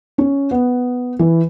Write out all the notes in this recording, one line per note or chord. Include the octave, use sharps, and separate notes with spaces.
C#4
B3
E3